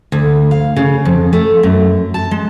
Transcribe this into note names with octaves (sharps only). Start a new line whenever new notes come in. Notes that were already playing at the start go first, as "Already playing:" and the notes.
D2
F5
C#3
F2
A3
F#2
A5
G#3